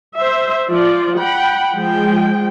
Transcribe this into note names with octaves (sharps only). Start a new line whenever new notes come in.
C5 E5
F3 F4 D5
F#5 G5 B5
F3 G#3 G5